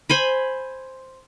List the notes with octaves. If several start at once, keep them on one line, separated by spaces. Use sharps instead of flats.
C5 G#5 B5